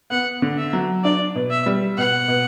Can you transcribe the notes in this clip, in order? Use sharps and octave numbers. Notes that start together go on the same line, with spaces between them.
B3 F#5
D3
E5
F#3
D4 D5
B2
E5
G3
B2 F#5
B2